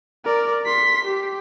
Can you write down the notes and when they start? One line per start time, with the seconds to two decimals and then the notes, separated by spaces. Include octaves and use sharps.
0.25 A#4 D5
0.65 C6 B6
1.05 G4